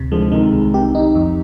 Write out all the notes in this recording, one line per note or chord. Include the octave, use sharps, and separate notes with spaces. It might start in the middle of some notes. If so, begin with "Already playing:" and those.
Already playing: D2 C3
D3 F3 G#3
C3 D#3 G#3
C2
C3 D#3 G4
D#4
F2